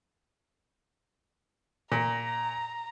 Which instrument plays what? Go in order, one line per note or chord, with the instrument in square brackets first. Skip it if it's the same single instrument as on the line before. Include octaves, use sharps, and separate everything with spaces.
[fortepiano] A#2 [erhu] A#5